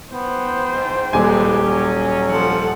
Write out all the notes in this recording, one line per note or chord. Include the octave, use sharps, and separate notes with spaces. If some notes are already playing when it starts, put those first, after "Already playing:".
B3 C5 G5
G#2
D#1 C2 E3 G#3 G4 G#5
F#3 C#4
F3 A4 F#5